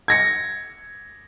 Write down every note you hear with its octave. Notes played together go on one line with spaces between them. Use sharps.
G#6 A#6 C#7